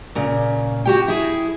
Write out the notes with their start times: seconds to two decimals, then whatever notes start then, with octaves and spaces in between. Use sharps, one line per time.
0.15 A#2 C#3
0.85 F#4 G4 G5
1.08 E4 G#4